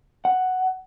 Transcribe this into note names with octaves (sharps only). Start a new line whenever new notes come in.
F#5